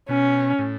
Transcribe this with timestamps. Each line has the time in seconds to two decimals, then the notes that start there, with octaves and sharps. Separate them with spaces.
0.09 B2 C#4
0.59 A2